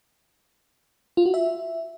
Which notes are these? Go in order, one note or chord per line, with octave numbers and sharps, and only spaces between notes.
F4
F#4
E5